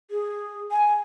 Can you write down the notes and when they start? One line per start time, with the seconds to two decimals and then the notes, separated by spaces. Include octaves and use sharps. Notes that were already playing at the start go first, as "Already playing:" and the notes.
0.11 G#4
0.71 G#5